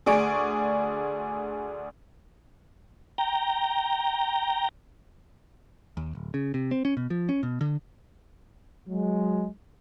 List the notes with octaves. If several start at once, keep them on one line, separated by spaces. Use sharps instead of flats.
D2 G#4 D5 G#5 C#6 D7
G5 A#5
D#2
D1
C#3
C3
C4
C#4
B2
F3
C#4
B2
D3
F#3 G#3